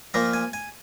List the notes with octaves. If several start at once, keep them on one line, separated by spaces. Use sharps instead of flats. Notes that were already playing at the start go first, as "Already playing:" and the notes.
A#2 F3 A#3 A#5
G#5
G#5